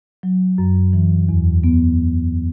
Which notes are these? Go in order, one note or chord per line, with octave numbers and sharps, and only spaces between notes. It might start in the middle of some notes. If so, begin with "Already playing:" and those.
F#3
F#2
E3
E2
B3